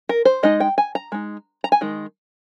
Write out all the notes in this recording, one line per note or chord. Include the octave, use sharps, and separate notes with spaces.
A#4
C5
G#3 D#4 D#5
G5
G#5
A#5
G#3 D#4
A#5
G#5
D#3 G#3